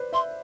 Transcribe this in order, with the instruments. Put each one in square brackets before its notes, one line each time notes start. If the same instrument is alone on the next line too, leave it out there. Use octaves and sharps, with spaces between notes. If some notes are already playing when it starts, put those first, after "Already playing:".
Already playing: [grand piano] B4 C5 D5
[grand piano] E5 [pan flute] C6